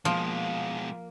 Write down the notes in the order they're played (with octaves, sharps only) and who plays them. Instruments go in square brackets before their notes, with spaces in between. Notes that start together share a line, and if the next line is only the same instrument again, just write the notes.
[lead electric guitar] B2 G#3 [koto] F3 [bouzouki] A#3